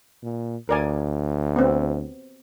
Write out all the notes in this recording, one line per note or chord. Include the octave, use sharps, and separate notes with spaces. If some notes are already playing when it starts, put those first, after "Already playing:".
A#2
D2 A#4 D5 G#5
B3 C4